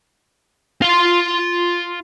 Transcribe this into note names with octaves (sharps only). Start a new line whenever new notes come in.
F4 C6